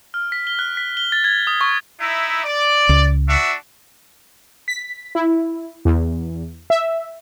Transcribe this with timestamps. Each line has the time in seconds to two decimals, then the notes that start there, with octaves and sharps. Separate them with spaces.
0.14 F6
0.32 B6
0.47 G7
0.59 F#6
0.77 B6
0.97 G7
1.12 A6
1.24 G#6
1.47 D#6
1.61 C#6
1.99 D#4 E4
2.44 D5
2.89 C#2
3.28 D4 F#4 E5
4.68 B6
5.15 E4
5.85 E2
6.70 E5